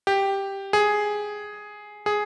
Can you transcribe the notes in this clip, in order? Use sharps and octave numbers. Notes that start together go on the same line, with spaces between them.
G4
G#4
G#4